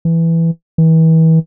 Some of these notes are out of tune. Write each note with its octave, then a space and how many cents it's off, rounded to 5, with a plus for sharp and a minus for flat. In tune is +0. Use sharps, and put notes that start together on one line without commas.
E3 +5
E3 -35